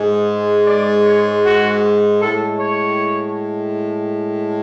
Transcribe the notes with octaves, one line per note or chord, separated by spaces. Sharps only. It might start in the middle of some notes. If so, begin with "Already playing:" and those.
Already playing: G#2 G#3
D5
C#5
F#4
A2 G#3 A4
C#5